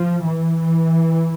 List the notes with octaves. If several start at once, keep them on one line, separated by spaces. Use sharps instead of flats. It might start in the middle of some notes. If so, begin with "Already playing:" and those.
Already playing: F3
E3